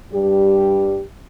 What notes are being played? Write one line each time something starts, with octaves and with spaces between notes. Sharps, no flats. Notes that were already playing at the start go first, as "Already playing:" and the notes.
G2 G3 G4